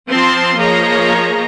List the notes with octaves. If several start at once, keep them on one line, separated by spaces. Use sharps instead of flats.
F3 C4 A5 C6
F3 A#3 G#4 C#5 D#5 A#5